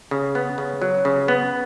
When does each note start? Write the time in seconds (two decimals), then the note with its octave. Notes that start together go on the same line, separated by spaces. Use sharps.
0.11 C#3
0.35 B3
0.58 C#3
0.82 F#3
1.05 C#3
1.28 B3